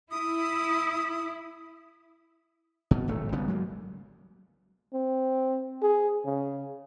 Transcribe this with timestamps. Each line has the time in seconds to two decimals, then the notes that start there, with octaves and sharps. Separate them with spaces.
0.11 E4 D#6
2.91 B2
3.08 D1 G#1 A3
3.32 G#1 C#3 G3 B3
3.48 F#3 G#3 A#3
4.94 C4
5.82 G#4
6.25 C#3